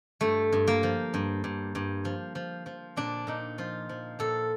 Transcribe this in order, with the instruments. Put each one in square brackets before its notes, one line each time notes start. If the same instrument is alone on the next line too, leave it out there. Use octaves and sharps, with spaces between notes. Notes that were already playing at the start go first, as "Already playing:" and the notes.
[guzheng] G2 A3
G2
A#3
F3
G2
G2
G2
F3
F3
F3
A#2 D4
A#2 D#4
F3 F4
F3
A#2 A4